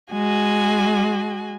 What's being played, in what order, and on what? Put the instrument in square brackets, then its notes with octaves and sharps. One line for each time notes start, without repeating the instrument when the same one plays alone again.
[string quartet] G#3 F#4 G#5